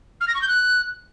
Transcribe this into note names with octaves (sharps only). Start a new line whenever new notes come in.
F6
A#6
C#6
G6
F#6